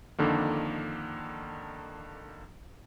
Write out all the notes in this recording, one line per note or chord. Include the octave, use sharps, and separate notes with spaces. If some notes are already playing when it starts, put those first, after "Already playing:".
F2 D3 D#3 A#3